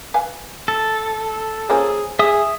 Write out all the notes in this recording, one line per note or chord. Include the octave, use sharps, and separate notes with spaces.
B4 F5 G#5
A4
F3 A#3 C#4 G#4
G#4 E5 D#6